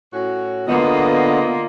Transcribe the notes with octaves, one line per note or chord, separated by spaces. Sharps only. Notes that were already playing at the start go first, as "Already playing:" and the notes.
A2 C#4 F#4
D3 A#3 B3 F4 D#5